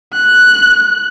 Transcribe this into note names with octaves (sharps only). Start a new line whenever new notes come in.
F#6